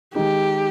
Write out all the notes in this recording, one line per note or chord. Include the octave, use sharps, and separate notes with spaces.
D#3 G#3 D#4 G4 G#4